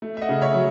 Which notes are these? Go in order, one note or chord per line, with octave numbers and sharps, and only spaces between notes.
A3
E5
D#5 F#5
C#3
C#5 E5
F#3